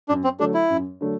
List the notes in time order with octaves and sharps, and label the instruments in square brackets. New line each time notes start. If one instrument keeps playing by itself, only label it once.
[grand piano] F#2 [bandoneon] D4
[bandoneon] C4
[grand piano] D3 F#3 A3 [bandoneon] D4
[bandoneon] E4
[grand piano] F#2
D3 F#3 A3